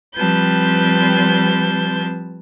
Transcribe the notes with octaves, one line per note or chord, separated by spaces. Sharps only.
F3 G3 C4 B4 A5 G6